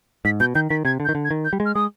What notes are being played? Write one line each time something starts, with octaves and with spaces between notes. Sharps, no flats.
G#2 B6
B2 G6
D#3 G6
D#3 B6
C3 G#6
D3
G6
D#3
D3
G#6
D#3
G6
G3
G#3
F6
G#3 D#6